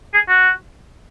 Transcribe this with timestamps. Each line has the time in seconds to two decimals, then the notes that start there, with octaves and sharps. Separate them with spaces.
0.14 G#4
0.28 F#4